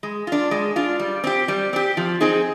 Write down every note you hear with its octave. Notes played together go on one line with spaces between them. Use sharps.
G#3
D4 F4
G#3
D4 F4
G3
C4 G4
G3
C4 G4
F3
C4 D#4 G#4